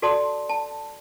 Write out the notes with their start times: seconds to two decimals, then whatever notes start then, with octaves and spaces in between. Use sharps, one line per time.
0.02 F#4 A4 D5 A5 C6 D#6
0.49 A5